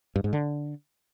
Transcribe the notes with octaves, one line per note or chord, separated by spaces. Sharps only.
G2
G#2
D3